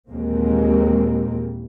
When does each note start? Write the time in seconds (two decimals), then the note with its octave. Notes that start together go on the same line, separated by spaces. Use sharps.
0.10 D#2 A#2 E3 G#3 A#3 C4